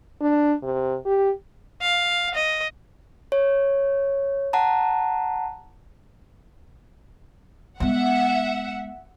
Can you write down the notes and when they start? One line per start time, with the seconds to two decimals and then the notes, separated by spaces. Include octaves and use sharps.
0.21 D4
0.63 C3
1.06 G4
1.82 F5
2.34 D#5
3.32 C#5
4.53 F#5 A5 A#5
7.80 G#3 B3 E5 F#5